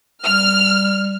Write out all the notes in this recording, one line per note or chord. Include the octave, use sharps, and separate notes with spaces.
G3 F6